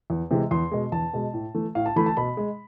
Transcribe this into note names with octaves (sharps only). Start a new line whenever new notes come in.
E2
C3 E3 G#3
E2 C6
B2 G#3
E2 A5
B2 G#3
A2
E3 A3
A2 F5
A5
E3 A3 B5
A5
B2 B5
G#3